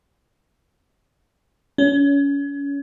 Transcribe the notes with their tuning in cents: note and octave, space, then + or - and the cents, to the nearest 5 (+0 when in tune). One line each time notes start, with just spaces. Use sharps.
C#4 +30